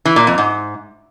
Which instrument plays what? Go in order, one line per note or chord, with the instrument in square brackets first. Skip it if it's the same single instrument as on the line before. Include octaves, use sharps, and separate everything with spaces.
[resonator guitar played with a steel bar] E3
A#2
F2
G#2